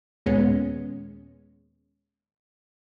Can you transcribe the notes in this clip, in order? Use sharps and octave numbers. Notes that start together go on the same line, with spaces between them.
D#2 A#2 G#3 B3 C#4